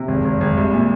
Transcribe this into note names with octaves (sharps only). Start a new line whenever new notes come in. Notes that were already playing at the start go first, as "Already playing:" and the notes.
Already playing: C3
G#1
G#1
G#1
C2
A#2